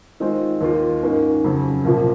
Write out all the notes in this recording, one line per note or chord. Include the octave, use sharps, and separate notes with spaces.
D#3 G#3 C4 F4
D#2 D#3 A#3 F4
G#2 D#3 A#3 C#4
F2 C#3 F#3
C2 A#2 F3 A#3